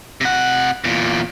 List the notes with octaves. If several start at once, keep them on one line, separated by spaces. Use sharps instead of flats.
C3 F#5
E2 A#2